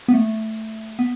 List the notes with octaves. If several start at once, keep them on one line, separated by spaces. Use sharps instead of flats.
B3
A3
B3